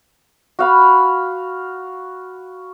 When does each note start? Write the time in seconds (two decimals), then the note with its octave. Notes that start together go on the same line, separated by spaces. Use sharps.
0.59 F#4 F5 B5